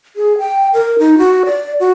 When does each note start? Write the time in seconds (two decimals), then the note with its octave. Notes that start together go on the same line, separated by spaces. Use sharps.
0.16 G#4
0.39 G5
0.74 A#4
0.99 D#4
1.18 F#4
1.46 D5
1.80 F#4